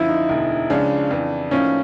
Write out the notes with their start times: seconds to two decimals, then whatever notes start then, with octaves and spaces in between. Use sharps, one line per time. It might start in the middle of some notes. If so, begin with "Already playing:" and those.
Already playing: F#2 D3 F3 E4
0.09 D#4
0.29 E1 D2 D3
0.70 C#2 C#3 F3 G#3 C#4 D4
1.11 F2 C#3 E3
1.51 A2 F3 A#3 C#4 D#4